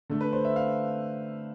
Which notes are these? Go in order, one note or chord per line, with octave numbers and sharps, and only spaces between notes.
D3 A3 A4
B4
C5
E5
F5